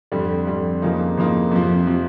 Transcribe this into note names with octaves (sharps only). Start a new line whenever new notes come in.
F2 D3 G3
F2 D3 G3
F2 C#3 F3 A#3 D#4
F2 C#3 F3 A#3 D#4
F2 C3 F3
C3 F3